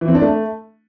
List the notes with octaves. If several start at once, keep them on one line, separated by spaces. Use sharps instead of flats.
E3
C4
D4
A3